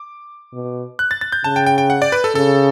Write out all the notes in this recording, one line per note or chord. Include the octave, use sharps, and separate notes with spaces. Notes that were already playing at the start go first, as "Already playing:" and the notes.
Already playing: D6
B2
F#6
A6
A6
G6
C#3 A5
G5
G5
G5
F#5
D5
B4
A4
C#3 A4